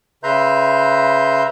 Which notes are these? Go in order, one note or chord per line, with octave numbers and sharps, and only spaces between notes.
C#3 B4 E5 A#5 C6 G6